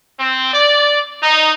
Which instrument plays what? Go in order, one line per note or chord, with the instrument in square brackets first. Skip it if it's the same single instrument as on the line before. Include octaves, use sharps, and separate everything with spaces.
[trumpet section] C4
D5
D#4